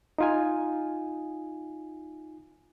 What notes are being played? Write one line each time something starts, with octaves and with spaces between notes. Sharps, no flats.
D#4 F4 G#5